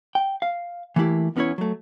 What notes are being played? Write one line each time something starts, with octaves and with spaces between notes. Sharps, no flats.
G5
F5
E3 A3 A#3 E4 G4
E2 B3 C#4 D#4 E4 C#5
F#3 A3